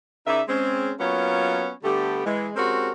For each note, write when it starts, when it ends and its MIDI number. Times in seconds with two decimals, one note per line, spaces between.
0.27 0.41 49
0.27 0.41 63
0.27 0.41 70
0.27 0.41 74
0.27 0.41 76
0.48 0.92 56
0.48 0.92 60
0.48 0.92 61
1.00 1.71 54
1.00 1.71 58
1.00 1.71 59
1.00 1.71 61
1.00 1.71 65
1.00 1.71 73
1.84 2.24 50
1.84 2.24 55
1.84 2.24 57
1.84 2.24 59
1.84 2.24 67
2.25 2.49 52
2.25 2.49 56
2.56 2.92 56
2.56 2.92 60
2.56 2.92 61
2.56 2.92 66
2.56 2.92 67
2.56 2.92 70